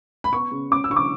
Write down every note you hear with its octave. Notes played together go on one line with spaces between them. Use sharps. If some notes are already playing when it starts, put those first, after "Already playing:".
B5
B3 C#6
C#3
C#4 D6
E6
D3 C#6
D6